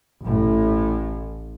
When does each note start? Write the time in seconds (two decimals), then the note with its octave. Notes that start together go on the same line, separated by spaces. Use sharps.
0.22 A1 A2